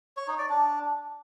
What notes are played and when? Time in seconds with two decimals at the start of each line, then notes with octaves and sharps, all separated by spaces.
0.17 C#5
0.28 D#4
0.38 D5
0.49 D4